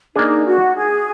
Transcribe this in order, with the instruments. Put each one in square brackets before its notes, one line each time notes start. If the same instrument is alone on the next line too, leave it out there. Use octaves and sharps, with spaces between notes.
[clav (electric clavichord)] A#3 D4 G#4 [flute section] D#4
[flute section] F#4
G#4